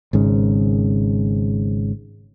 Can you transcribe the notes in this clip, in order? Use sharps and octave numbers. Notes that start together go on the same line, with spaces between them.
G#1 G#2 C#3